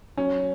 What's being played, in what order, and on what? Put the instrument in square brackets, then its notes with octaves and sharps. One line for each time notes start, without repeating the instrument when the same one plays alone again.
[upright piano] F#3 C#4